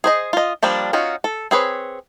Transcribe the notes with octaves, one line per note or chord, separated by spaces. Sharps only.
G#4 C5 D#5
F4 D#5
F3 G3 A#3 D4
C#4 D#4 F4 F#4
A4
C4 G#4 B4 C#5